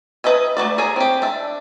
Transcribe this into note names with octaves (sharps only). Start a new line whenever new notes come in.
B4 D#5 E5 G#5
A3 A#3 F#4 D5
G#4 C#5 E5 G#5 A#5
C4 G4
D4 E5